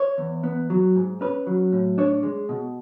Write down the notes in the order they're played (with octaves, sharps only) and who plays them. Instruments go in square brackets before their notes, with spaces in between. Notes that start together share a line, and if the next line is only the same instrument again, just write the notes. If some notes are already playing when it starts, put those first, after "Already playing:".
Already playing: [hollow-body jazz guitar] C#5
E2
B3
F#3
G#2
C#4 B4
F#3
A2
D4 C#5
G#3
B2